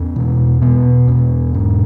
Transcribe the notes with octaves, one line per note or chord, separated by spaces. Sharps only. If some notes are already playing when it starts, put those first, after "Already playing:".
Already playing: E2 C#4
B2
B2 B3
E2
G#2